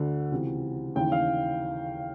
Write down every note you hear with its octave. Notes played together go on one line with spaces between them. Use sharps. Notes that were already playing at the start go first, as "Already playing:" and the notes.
Already playing: D2 D3
C#2 C3 E3
D#2 C#3 E3 G5
F5